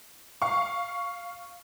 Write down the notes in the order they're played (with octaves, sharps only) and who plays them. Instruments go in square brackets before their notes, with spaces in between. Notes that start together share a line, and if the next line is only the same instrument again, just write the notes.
[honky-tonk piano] F5 C#6